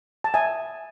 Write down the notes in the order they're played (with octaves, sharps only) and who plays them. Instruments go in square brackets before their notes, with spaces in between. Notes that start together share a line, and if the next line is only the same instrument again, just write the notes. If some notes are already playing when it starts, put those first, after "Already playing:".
[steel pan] A5
E5 G#5